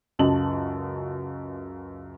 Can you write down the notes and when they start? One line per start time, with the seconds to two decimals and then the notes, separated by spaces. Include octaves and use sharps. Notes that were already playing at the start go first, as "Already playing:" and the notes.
0.19 C#2 F#2 F#4 D#5 A5 F#7